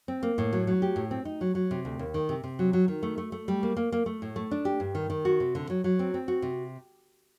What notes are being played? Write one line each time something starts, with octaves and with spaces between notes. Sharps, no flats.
C4
A#3
A2
F#3
F#3
G4
A2
C4
D#4
F#3
F#3
C3
D2
D#2
D#3
C3
C3
F#3
F#3
D#3
A3
A3
A3
G3
A#3
A#3
A#3
A3
A2
A3
D4
G4
G2
D#3
D#3
F#4
C3
D3
F#3
F#3
C4
C4
F#4
C3